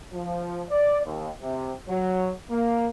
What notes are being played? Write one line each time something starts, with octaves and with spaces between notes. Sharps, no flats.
F3
D5
D#2
C3
F#3
A#3